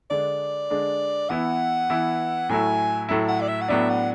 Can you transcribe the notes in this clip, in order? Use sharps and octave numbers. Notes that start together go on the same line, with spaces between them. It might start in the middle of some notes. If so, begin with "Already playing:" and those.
D3 G#3 D4 D5
D3 G#3 D4
E3 B3 E4 F#5
E3 B3 E4
A2 F#3 A3 E4 G#5
A2 F#3 A3 E4
F#5
D5
E5
F#5
A2 F#3 B3 D4 E5
F#5